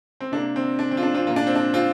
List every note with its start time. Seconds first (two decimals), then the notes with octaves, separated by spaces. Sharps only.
0.20 C4
0.32 C3 A#3 D4
0.56 C4
0.79 D4
0.91 C4
0.97 F4
1.03 D4
1.14 C4 F4
1.27 A#2 A#3 F4
1.36 D4
1.47 C4
1.55 D4
1.74 C4 F4